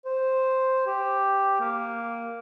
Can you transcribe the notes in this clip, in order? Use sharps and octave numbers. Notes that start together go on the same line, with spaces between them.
C5
G4
A#3